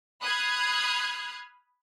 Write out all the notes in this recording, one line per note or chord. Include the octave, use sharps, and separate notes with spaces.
B5 D#6 F6 F#6 G#6 C7